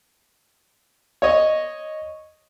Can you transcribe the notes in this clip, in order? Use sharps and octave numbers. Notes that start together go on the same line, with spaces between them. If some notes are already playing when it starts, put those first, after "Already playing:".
C#5 D#5